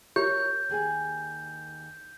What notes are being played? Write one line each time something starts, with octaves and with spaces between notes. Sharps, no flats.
G4 A#4 C#5 G6
D#2 G#4 G#5